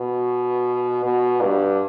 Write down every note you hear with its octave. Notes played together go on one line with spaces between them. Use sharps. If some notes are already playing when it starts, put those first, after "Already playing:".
Already playing: B2
B2
G2